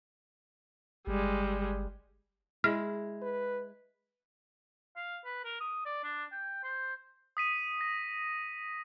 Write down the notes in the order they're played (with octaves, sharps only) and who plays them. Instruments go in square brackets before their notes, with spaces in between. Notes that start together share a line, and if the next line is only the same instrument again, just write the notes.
[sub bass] G1 [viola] G3 G#3
[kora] G#3 E4 [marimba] F6
[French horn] B4
[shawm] F5
B4
A#4
D#6
D5
D4
G5
C5
[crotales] D#6 B6 D#7
A#6